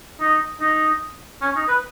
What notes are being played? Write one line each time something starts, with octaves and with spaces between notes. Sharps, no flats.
D#4
D#4
C#4
D#4
B4